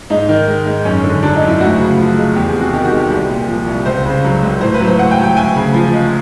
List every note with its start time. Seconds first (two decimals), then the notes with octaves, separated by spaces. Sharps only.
0.10 G#2 D#4
0.29 D#3
0.47 G#3
0.66 G#2
0.85 F#2 C#4
1.04 D3
1.23 F#3 D4
1.36 D#4
1.42 F#2
1.47 E4
1.61 D2 F#4
1.80 C#3
1.98 F3
2.17 G#3
2.35 E2 G4
2.49 G#4
2.54 C3
2.60 F#4
2.73 D#3 G4
2.85 F#4
2.92 G#3 G4
3.10 C2
3.30 A#2
3.48 F3
3.67 C2
3.86 C#2 C5
4.06 C#3
4.24 F#3
4.42 C#2
4.61 A2 C5
4.74 B4
4.80 F#3
4.87 C5
4.98 A2 F#5
5.11 G5
5.18 F#3
5.24 G5
5.37 D2 G#5
5.56 C#3
5.74 F3
5.93 G#3